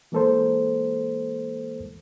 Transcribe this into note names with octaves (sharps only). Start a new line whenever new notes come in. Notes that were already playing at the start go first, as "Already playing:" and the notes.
E3 G#3 A#3 A4 A#4 C5